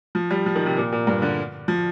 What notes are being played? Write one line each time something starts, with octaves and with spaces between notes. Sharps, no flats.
F3
G3
F3
D#3
C3
A#2
A#2
G2
D3
F3